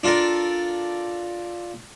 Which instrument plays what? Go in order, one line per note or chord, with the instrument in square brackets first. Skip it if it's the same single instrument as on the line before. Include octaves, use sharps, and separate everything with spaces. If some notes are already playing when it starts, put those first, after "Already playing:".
[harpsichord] D4 F4 A4 A#4 D5